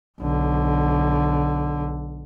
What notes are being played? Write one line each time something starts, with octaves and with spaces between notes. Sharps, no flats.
B1 D3